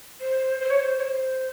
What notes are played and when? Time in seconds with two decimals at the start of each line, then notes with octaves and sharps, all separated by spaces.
0.20 C5
0.60 C5
0.70 C#5
0.80 C5
0.98 C#5
1.02 C5